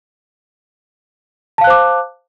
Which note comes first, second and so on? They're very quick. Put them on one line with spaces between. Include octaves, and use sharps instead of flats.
A5 F5 F#6 C5 D6